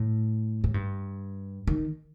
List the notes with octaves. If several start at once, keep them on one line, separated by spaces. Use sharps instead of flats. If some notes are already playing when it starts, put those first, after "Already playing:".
Already playing: A2
A2
G2
D#3